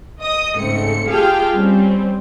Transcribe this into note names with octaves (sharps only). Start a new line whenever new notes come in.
D#5 D#6
G#2 C#3 A3 C4 C#7
F4 G4 G#4 F5 G5 A5
G3 C4 C#4